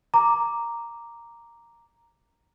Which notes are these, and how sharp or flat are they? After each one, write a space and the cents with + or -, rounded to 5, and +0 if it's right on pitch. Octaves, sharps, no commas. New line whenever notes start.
A#5 +0 D6 +0